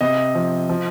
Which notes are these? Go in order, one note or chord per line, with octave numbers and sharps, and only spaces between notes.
C3 D#5
F3
F3